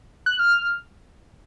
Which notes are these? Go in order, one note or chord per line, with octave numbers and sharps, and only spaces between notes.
F#6
F6